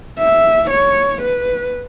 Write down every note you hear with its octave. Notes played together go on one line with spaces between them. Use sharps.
E5
C#5
B4